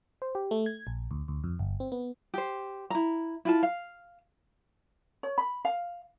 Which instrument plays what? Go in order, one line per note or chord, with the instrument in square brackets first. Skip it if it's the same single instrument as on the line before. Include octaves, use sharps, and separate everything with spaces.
[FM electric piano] C5
G4
A3
G#6
A#1
D2
D2
F2
G1
C4
B3
[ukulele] G4 C5
E4 A#5
E4 F4 A5
F5
C#5
B5
F5